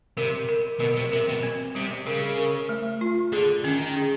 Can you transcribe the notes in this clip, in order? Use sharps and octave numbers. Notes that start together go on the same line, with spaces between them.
C3 A#4
A#4
B2 A#4
C3
C3 A#4
B2
C4
C3 G3
C#3 A#4
A#4
A3
F4
D3 G#4
D#3 C#4
G#4